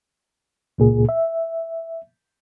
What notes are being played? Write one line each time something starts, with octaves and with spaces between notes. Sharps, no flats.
C#2 A#2 G#4
E5